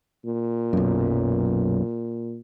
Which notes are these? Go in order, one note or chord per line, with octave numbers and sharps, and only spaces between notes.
A#2
B1 F#2